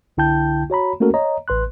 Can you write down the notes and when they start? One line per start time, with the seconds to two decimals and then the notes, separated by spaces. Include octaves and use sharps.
0.17 C2 D3 E4 G5 A5 G6
0.70 F#4 C#5 A#5 B5
1.00 A3 A#3 C#4 F#4 A4 A#4
1.14 C#5 D#5 A#5
1.48 A1 B4 C6 F#6